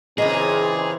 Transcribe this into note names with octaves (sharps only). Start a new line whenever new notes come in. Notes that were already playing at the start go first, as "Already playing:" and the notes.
A#2 C#3 E3 C4 G#4 D#5 A#5